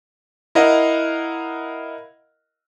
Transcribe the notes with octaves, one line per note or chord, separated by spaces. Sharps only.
E4 A#4 D#5 F5 F#5